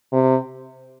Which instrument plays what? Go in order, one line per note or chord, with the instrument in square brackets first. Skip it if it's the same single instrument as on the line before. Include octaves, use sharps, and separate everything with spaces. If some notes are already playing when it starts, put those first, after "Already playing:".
[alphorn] C3